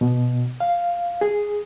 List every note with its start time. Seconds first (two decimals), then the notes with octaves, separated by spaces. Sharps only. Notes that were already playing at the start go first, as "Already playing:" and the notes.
0.01 B2
0.60 F5
1.21 G#4